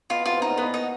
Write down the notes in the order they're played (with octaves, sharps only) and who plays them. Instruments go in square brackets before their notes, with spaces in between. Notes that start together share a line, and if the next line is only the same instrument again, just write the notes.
[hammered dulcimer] B2 [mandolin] F4
[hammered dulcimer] C3 [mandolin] F4
[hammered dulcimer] B2 [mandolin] D#4
[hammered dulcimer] A#2
[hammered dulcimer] B2 [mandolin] B3
[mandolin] D#4